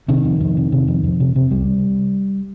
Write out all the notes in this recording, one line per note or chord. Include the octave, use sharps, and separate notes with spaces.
C3 D#3
F2
F2
C3
C3
F2
F2
C3
C3
C2 G3